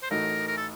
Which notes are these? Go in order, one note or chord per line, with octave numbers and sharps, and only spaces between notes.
C5
A1 A2 A3 D#4 F#4 A#4
A#4
A4